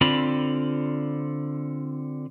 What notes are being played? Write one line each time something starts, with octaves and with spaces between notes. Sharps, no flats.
D3 C4 F4 D5 B5